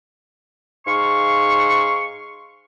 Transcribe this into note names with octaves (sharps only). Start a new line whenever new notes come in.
G#2 F5 C6 C#6